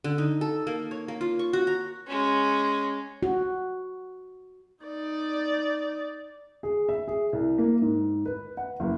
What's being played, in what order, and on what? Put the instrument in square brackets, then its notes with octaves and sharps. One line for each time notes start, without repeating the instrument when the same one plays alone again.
[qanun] D3
D#4
A4
A#3
C#5
A#3
F4
C#6
F#4
A#5
[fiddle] G#3 C#4
[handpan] F#4
[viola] D#4 D5
[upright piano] G#4
E5
G#4
C2
A#3
G#2
B4
F#5
F#1